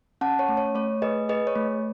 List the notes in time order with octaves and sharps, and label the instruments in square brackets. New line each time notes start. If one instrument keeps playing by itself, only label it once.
[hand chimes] C#4 F#5 A5
C#5
A3
C#5
A3 C#5
G#4 B4 D#5
G#4 B4 D#5
C#5
A3